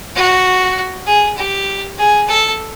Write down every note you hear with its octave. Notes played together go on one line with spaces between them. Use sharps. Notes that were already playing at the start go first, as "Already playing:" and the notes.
F#4
G#4
G4
G#4
A4